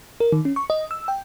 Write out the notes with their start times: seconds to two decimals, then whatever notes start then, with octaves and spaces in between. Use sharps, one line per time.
0.20 A#4
0.32 D#3
0.45 C#4
0.56 C#6
0.70 D#5
0.91 E6
1.08 G5